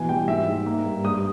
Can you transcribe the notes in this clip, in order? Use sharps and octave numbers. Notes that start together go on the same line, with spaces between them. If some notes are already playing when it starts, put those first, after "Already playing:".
Already playing: B2 E3 G#5
G3 G5
G#2 E5
G#2
A#3
G2
G2 D#6